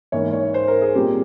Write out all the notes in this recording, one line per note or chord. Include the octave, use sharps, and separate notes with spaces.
G#2 E3 A#3 C#5
C#5
C5
A#4
G#4
A#2 G3 C4 F4 G4